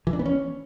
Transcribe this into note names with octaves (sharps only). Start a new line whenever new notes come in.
E3
D4
B3
C#4